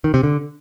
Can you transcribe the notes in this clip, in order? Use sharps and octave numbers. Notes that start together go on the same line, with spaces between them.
D#3
C3
D3